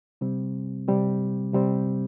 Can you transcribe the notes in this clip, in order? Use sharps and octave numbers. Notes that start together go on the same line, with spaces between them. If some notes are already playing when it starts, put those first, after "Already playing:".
C3 G3 C4
C3 G3 C4
C3 G3 C4